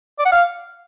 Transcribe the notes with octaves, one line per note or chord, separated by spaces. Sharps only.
D5
F#5
F5